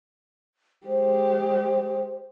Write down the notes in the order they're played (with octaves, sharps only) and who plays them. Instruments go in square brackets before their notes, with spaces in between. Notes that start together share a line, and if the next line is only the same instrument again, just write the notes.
[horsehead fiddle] G#3 G4 [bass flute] C5